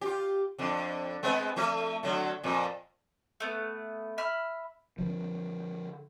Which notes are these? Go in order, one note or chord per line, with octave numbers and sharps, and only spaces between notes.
F4 G4
F2 D3
G#3 B3 C4
F3 A3 E5
D3 F#3 A3
F2 A#2
A3 B3
E5 B5 F6
D3 F3